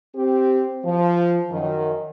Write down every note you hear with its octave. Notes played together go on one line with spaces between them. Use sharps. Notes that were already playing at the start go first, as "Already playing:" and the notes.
C4 G4
F3
F#2 D#3